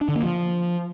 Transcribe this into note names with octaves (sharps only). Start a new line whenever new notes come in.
D4
D3
A#3
F3